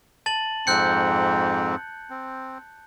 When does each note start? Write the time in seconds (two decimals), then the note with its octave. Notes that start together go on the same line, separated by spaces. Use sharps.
0.26 A5 A6 F#7
0.67 F2 G#2 C4 F#6 G6 C#7
2.10 C4